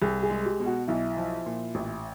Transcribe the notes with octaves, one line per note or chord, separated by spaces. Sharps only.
C2 G#4
G#4
G#3
G4
B2
F#4
B1 E4
F3
A#2
A1